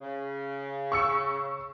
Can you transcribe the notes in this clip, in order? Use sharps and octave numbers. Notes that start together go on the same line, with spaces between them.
C#3
C#6 E6 C#7